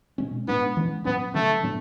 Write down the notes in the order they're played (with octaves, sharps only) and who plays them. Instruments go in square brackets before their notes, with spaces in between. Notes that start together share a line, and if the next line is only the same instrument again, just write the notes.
[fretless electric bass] B2 G#3 C#4
[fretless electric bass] A2 G#3 D4 [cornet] B3
[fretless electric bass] E3 G#3 C#4
[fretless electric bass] A2 F#3 C#4 [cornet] B3
[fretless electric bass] C#3 F#3 C#4 [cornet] A3
[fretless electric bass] A2 F#3 B3 D4